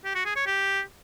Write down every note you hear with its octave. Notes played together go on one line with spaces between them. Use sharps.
G4
F#4
G#4
C#5
G4